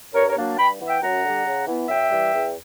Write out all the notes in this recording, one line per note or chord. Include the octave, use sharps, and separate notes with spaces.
G2 A#4 C#5
A#4 C#5
F#3 A#3 D4
G2 G5 B5
E3 B3
E5 G5
F#2 F#5 A#5
D3 G3
C#3
E3 B3 E4
F#2 E5 G5
E3 G3
E2